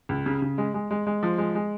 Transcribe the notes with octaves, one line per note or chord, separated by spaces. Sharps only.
C#2
C#3
C#3
G#3
G#3
G#3
G#3
F3
G#3
G#3